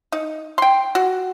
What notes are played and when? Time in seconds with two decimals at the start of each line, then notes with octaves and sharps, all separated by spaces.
0.12 D#4
0.58 G5 C6
0.95 F#4